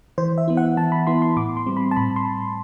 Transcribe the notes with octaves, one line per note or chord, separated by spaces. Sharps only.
E3 C5
E5
B3 E4
F#5
E3 A5
B5
B3 E4 C6
C6
A2 D6
C6
G3 C4
B5
A5
A2 B5
C6